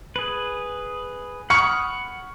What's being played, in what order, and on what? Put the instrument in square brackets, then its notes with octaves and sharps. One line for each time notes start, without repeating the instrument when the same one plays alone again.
[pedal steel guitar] G#4 B4
[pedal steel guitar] F#5 B5 D#6 [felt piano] C#6 F6 C#7